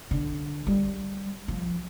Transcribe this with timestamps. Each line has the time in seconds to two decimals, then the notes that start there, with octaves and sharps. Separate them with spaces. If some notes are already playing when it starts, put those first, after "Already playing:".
0.11 D3
0.67 G3
1.48 F3